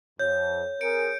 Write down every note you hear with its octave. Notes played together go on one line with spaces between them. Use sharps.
F2 C#5 G6
C4 G#4 A#4 C#7 D7